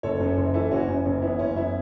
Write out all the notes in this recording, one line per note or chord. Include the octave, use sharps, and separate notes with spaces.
F#1 A4 C#5
F#2
F#1
E3 E4 A4
F#1 C#4 F#4
F#2 C#4
F#1 C#4
E3 B3 E4
F#1 C#4
F#2 B3 E4